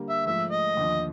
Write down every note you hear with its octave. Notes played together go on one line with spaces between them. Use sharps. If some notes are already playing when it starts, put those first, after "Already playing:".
Already playing: D3 G3 A#3
E5
G#2 F3 A3 E5
D#5
D#2 D3 F3